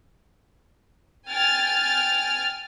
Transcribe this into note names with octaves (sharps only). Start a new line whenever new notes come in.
G5 G#5 F6 A6